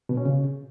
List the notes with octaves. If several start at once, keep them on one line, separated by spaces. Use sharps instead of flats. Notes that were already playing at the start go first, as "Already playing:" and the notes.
B2
C#4
C#3